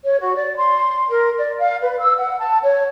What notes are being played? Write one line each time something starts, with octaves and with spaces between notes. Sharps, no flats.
C#5
F#4
D5
C6
A#4
D5
F5
B4
E6
F#5
A5
C#5